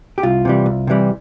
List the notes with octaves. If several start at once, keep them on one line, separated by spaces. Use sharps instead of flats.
G4
C2 F4
C3 E3 G3
C2
C3 E3 G3